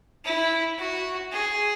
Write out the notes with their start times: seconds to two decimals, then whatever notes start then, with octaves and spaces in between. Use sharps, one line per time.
0.25 E4
0.78 F#4
1.32 G#4